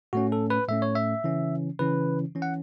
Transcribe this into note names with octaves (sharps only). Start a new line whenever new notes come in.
A2 A3 C#4 F#4
A4
B4
A2 A3 C#4 E5
C#5
E5
C#3 E3 C#4
C#3 E3 C#4 B4
E3 C#4
F#5